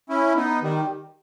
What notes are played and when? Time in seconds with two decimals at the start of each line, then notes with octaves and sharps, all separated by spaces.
0.09 C#4 E4
0.36 B3 D#4
0.62 D#3 G3